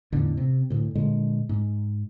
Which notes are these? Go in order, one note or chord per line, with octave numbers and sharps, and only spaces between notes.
E2 A2 D3 D#3
C3
D2 A2
A#2 D3 G#3
G#2